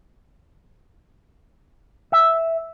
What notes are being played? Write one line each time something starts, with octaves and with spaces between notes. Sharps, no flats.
E5